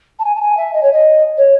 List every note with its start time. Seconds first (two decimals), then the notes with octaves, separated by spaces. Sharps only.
0.19 A5
0.25 G#5
0.35 A5
0.41 G#5
0.57 E5
0.74 D#5
0.82 C#5
0.93 D#5
1.37 C#5